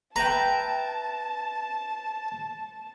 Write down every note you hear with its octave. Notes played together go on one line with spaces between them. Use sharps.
B4 E5 G5 A5 A#5